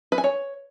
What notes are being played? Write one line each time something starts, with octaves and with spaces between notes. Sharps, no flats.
B4
G#5
C#5